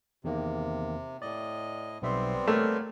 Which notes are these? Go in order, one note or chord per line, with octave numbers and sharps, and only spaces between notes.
E2 C3 D#3 A#3
A2 D5 D#5
B1 G3 B3 C4 E5 C6
A3 A#3 C#5 F6